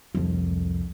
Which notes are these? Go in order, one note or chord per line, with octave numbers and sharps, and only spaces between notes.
C2 F2